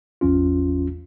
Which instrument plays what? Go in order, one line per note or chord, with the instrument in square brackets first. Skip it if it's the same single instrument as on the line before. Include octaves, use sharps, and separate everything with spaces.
[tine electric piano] G#1 E2 F3 C#4 F4